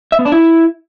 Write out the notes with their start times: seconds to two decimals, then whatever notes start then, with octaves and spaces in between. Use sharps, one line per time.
0.12 E5
0.19 B3
0.25 D4
0.32 E4